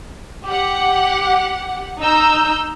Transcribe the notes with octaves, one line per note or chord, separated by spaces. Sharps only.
G4 F#5
D#4 A#5 E6 G6